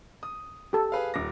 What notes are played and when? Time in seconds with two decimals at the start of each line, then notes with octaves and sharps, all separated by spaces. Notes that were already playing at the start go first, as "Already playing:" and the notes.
0.23 D#6
0.73 G4 A4
0.92 G#4 B4 F5
1.14 D#1 D6 A#6